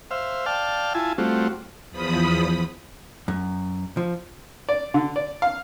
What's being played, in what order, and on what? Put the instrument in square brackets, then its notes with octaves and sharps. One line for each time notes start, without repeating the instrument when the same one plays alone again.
[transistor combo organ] C5 E5 F5
D5 F5 G5 A5 F6
E4 F4 G#5 A5
G3 A3 C4 F4 F#4
[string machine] E2 F3 B5 D#6
[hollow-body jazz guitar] F#2
F3
[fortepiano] D5
D3
D5
F5